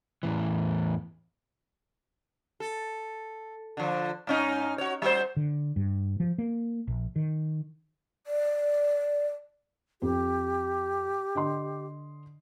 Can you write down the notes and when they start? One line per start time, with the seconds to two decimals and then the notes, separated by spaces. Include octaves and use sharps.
0.23 E2 A2 E3
2.60 A4
3.77 D3 F3
4.27 G#2 C#4 D#4
4.78 F#4 C#5
5.02 G3 F#4 C5
5.37 D3
5.76 G2
6.20 F3
6.38 A#3
6.87 A#1
7.16 D#3
8.27 D5
10.02 F2 G4
11.35 D3 D#5 C6